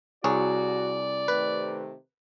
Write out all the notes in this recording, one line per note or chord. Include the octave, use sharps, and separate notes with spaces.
C2 F#4 G#4 C#5 D5
C3 D#3 A3 B4